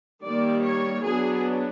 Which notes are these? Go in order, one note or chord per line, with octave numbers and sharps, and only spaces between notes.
D#3 G3 A#3 D5
C#5
F#3 B3 D4 G#4